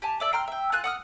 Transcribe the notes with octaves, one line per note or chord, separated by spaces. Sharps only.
G4 G#5 A5
D5 E5 D6
G5 A#5 C6 F6
E5 G5
F4 G#5 F#6
F#5 D#6 F6